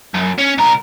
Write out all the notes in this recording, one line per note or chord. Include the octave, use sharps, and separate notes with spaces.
F#2
C#4
C2 A#4